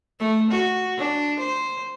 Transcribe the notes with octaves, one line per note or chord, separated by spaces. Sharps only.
A3
F#4
D4
C5